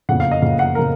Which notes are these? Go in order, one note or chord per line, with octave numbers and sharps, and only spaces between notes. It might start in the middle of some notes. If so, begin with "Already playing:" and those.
F#1 F2 C#3 F#5
F5
D#5
F#1 F2 C#3 F5
F#5
C#3 A#4